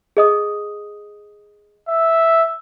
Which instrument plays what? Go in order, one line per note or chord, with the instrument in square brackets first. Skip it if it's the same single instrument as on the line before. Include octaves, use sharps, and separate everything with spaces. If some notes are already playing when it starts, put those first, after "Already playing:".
[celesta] G#4 D#5 D#6
[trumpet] E5